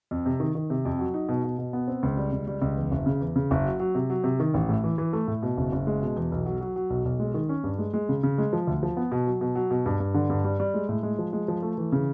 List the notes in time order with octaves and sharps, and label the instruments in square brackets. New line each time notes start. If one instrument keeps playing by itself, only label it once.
[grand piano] F2
C3
D#3
D#3
C3
F2
F#3
D#4
B2
B2
B2
B3
C4
C#2
G3
C#2
G3
C#2
E2
F#1
C#3
E2
C#3
F#1
F#3
F#3
C3
F#3
C3
D#3
A1
A2
E3
E3
A3
A2
B2
F#1
F#1
G#3
B2
E2
B1
F#3
F#3
F#3
B1
B1
G#3
D#3
C#4
G2
G#3
G#3
C#3
C#3
G#3
F3
D2
F3
B3
B2
F#3
B2
F#3
B2
G2
G2
D3
G2
G3
G3
G#3
A2
G#3
F3
G#3
F3
A3
E3
C#3